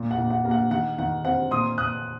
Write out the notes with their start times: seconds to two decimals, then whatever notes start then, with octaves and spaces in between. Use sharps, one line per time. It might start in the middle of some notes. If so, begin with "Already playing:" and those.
Already playing: A#2
0.11 F#5
0.18 A#2
0.30 F#5
0.45 A#3
0.51 F#5
0.71 D#3 F#5
0.98 D#3 F#5
1.25 C4 F#5
1.51 A#2 C6 D#6
1.78 A#2 D#6 F#6